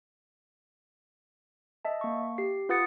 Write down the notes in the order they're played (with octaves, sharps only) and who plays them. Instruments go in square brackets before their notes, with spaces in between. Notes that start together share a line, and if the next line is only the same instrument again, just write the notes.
[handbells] D#5 E5 A5
A#3 C#6
G4 C7
F4 B4 F#5 D#6 A6 C#7